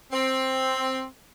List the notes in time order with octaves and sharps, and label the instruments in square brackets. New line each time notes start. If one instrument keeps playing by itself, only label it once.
[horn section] C4